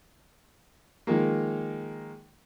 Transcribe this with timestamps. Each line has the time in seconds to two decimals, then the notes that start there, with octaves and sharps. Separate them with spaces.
1.07 D#3 F3 G#3 A#3